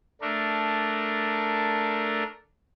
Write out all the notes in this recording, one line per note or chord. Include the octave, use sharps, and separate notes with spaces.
A3 D4 A#4